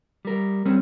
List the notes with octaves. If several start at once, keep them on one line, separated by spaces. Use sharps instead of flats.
G3 A#4
G3 C4 C#4